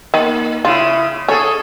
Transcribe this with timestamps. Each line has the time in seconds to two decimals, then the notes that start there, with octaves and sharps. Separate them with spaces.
0.14 D#3 A#3
0.65 C#3 E4 F4
1.29 C#4 G#4 A4 C#5